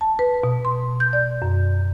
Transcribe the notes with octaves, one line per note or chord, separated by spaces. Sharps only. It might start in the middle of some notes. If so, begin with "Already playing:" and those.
A5
B4
B2
C6
G6
D5
F#2